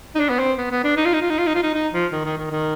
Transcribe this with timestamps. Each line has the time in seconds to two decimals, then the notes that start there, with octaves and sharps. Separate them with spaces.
0.15 D#4
0.20 D4
0.29 B3
0.39 C4
0.58 B3
0.71 B3
0.84 D4
0.97 D#4
1.05 F4
1.13 D#4
1.22 F4
1.30 D#4
1.38 F4
1.47 D#4
1.55 F4
1.63 D#4
1.74 D#4
1.93 F3
2.12 D#3
2.25 D#3
2.38 D#3
2.51 D#3